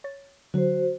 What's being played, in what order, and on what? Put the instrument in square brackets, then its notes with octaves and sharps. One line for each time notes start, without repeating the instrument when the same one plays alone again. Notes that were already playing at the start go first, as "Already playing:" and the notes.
[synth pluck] C#5 A6
[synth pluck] D3 F#3 [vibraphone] F#4 C5